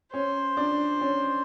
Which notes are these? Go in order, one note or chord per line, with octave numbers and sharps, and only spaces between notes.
C#4 C5
D4
C#4